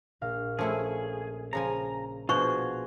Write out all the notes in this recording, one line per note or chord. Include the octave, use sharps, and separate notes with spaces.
A#1 F5 A#6
F3 A3 C#4 E4 G#4
C#3 F3 G#5 A#5
B2 F3 D4 F4 F#4 G#4 C5 C#6